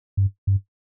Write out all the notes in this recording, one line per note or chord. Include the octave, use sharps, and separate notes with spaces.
G2
G2